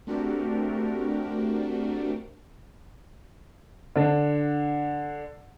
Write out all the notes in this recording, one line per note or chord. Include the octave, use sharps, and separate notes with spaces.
A3 C4 D4 F#4 G4 A#4
D3 D4